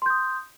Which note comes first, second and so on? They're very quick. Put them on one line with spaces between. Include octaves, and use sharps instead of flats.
C6 G6 D#6